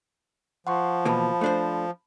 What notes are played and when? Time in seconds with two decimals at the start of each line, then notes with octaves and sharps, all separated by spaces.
0.67 F3 F#5 C6 C#6
1.05 B2 E3 A#3 A5 B5
1.41 A3 D4 C5